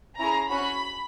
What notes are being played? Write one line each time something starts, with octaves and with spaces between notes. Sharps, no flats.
C#4 E4 G#4 A#5
C#4 F#4 B5